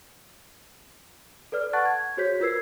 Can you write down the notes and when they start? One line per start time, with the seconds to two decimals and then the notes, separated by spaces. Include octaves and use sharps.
1.52 A4 B4 D5 F6
1.73 F#5 A5 C#6 F#6 A6
1.85 G#6
2.17 F#4 G#4 C5 C#5 G6 B6
2.40 F4 A#4 B4 E6 G#6 C7